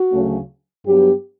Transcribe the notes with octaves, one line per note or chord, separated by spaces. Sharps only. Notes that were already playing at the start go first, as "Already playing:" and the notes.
Already playing: F#4
D2 C#3 F#3 A3 C#4
G2 F#3 B3 G4